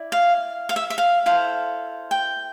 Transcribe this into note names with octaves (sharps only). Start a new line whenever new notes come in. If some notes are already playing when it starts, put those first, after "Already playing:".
Already playing: E4 D5
F5
F5
E5
E5
F5
E4 A4 C5 F5
G5